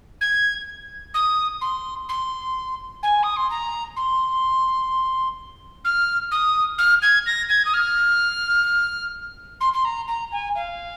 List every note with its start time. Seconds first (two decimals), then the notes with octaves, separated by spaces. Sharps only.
0.21 G#6
1.14 D#6
1.61 C6
2.08 C6
3.02 G#5
3.23 D#6
3.36 C6
3.50 A#5
3.96 C6
5.84 F6
6.31 D#6
6.78 F6
7.02 G#6
7.26 A#6
7.49 G#6
7.65 D#6
7.73 F6
9.60 C6
9.73 C6
9.84 A#5
10.07 A#5
10.32 G#5
10.55 F5